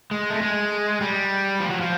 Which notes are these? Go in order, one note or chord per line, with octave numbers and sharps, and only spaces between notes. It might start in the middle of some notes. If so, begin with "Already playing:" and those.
G#3
A3
G#3
G3
F3
F#3
F3